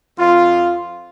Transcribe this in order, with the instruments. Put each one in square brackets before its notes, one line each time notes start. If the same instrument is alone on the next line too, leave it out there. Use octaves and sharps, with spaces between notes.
[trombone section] F2 F4